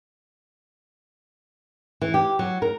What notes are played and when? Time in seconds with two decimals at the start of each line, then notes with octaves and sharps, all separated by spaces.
2.01 E3
2.14 G4
2.39 F#3
2.62 A#4